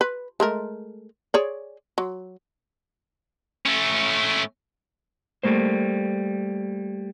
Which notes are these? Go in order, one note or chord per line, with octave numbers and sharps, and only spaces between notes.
B4
G#3 A3 A#4
G#4 C#5 D5
F#3
A3 C#4
G3 A3 A#3 C5